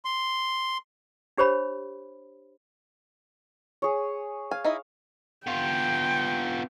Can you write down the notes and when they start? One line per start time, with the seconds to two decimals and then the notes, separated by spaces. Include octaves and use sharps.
0.05 C6
1.38 D4 G4 C5 C#5 B5
3.82 G#4 C#5
4.51 F5 G#5
4.64 D#4 E4 D#5
5.47 B3 F4 G5